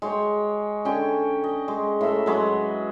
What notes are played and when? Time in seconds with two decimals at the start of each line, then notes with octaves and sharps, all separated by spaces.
0.02 G#3 C#5 G5
0.85 D3 C#4 G5 G#5
1.44 D#5
1.68 G#3
2.01 A2 E5
2.26 F#3 G#3 B4 E5